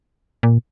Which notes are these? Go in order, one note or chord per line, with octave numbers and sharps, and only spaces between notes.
A#2